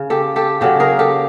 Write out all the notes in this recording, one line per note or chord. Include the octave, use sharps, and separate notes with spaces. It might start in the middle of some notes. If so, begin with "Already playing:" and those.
Already playing: C#3
G4 A4
G4 A4
C#3 F#3 G4 A4
G#4 A#4
G4 A4